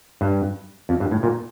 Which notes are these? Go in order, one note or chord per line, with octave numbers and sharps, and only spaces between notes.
G2
F2
G2
A2
A#2